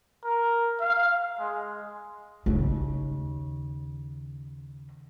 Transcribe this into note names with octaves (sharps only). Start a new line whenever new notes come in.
A#4
F5
G#3
D#2 C#3